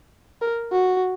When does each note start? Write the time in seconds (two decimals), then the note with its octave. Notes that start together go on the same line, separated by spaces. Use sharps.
0.41 A#4
0.72 F#4